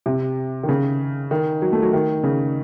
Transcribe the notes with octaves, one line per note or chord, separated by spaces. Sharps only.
C3
D#3
C#3
D#3
F#3
A3
F#3
D#3
C#3